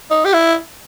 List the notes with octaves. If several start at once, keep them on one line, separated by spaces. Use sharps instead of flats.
D#4
G4
E4